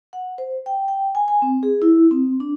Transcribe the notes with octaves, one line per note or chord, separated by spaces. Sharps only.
F#5
C5
G5
G5
G#5
G#5
C4
G#4
E4
C4
D4